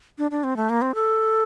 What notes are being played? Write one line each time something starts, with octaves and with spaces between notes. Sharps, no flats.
D4
D4
C4
A3
A#3
C4
A4